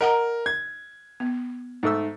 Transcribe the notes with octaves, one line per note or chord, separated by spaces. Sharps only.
A#4 D#5 F#5 A#5
G#6
B3
G#2 A3 E6